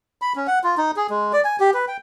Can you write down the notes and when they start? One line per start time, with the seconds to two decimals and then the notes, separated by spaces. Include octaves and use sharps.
0.22 B5
0.36 C#4
0.47 F#5
0.64 F4
0.78 D#4
0.96 G#4
1.10 G#3
1.33 D5
1.44 G#5
1.60 G4
1.74 B4
1.88 G5